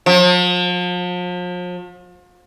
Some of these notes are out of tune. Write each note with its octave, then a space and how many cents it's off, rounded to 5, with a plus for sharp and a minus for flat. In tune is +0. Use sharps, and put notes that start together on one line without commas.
F3 +40